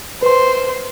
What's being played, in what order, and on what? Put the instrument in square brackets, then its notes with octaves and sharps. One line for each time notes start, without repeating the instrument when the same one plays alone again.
[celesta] B4 C6 [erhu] C5